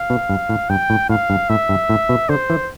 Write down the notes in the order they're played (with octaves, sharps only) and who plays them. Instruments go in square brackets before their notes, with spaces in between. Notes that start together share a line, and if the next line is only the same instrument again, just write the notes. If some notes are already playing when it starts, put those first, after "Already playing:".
Already playing: [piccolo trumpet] F5
[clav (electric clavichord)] B2
G2
A2
[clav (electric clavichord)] G2 [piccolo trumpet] G5
[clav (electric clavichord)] A2
[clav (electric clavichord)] A2 [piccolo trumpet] F5
[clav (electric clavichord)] G2
[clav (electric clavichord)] A2 [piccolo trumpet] E5
[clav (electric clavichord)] G2
A2
B2
[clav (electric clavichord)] D3 [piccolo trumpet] C5
[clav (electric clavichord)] E3